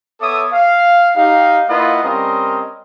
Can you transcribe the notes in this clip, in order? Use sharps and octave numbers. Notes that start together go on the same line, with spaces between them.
B3 A4 C#5 E5 D6 D#6
F5
D#4 G4 F5
A#3 E4 F4 B4 D#5 F#5
G3 C4 C#4 A#4 D#5 C6